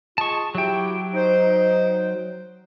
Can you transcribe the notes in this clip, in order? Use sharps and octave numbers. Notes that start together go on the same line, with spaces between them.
G#3 F4 G#4 A5 C#6
F#3 E4 F#4 G4 G5
D#4 C5